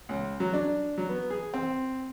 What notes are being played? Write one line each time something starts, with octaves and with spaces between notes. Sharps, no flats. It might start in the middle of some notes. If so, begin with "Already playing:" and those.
C#2
F#3
D4
F#3
B3
G#4
C4